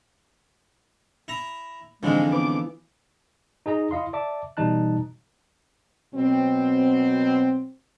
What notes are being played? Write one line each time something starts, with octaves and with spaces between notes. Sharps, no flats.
E4 A#5
F2 G#2 D3 E3 F3 G#3
B3 D6
D#4 G#4 D#5 A#5
E4 D#5 F5 C6
D5 E5 A5 D6
B2 E3 G3 D#4 A5 F#6
B2 F#3 C4